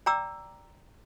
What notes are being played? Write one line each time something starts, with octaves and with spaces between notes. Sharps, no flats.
D5 G5 A#5 D6 E6